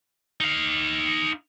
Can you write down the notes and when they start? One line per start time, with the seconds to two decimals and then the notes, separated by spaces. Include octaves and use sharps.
0.40 D#4 F5